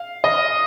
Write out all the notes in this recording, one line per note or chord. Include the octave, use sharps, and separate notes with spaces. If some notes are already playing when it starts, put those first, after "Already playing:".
Already playing: F5
D#5